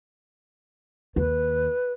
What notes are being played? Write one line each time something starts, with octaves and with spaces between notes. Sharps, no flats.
D#2 B4